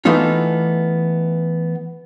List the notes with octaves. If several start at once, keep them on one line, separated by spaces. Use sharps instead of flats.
E3 A3 B3 D#4 F4